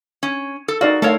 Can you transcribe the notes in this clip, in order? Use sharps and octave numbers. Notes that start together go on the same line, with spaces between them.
C#4
A4
D#4 F#4 D5 F5
A3 A4 A#4 C#5 F5